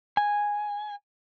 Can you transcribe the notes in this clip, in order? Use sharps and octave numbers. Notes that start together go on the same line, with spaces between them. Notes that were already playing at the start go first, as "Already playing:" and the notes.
G#5